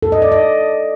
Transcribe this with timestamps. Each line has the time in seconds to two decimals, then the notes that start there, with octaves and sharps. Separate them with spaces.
0.03 A4
0.12 D#5
0.22 D5
0.32 D#5